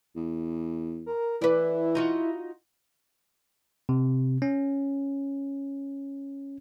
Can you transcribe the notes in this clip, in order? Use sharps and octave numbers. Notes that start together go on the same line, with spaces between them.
E2
A#4
E3 E4 B4 D5
D#4 F4 F#4
C3
C#4